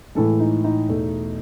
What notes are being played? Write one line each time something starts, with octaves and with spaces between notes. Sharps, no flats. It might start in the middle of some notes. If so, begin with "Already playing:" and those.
A2 E3 G#3 A4
D#4
D#4
E2 B2 A3